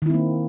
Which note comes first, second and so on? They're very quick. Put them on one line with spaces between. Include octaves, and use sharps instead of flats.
D#3 E4 C4 A#3